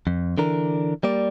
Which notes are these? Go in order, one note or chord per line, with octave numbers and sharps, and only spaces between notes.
F2
D3 E3 D4 A#4
G3 A#3 D5